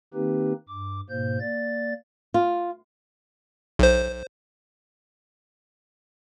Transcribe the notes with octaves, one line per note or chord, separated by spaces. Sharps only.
D#3 A#3 C4 D#4 G4 B4
G2 D6
G#2 B2 A#3 C5 G6
A#3 D5 A6
F4
B1 C5